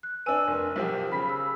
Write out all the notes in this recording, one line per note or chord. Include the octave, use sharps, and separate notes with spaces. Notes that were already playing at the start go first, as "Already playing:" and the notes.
F#6
D4 B4 G#5 E6 D#7
F1 A#4
B1 F3 G4
C#3 B5 B6
E6